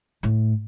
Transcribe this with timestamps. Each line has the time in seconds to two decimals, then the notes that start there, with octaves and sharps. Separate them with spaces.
0.23 A2